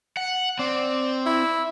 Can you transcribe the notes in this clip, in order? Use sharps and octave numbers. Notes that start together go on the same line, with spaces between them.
F#5
C4 D5
E4